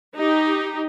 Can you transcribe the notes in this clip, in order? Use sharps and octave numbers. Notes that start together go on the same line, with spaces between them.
D#4 G4